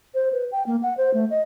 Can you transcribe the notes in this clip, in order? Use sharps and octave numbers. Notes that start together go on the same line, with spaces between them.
C5
B4
G5
A#3
F#5
C5
A3
D#5